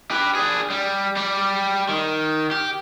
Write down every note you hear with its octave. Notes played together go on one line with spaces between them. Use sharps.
G4 B4
D4 G#4
G3
G3 G4
D#3
G4